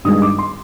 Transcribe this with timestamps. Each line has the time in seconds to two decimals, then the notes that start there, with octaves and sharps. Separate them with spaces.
0.04 G2 D#3 G#3 D#6
0.22 D6
0.39 C6